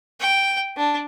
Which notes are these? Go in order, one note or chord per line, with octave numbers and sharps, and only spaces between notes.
G5
D4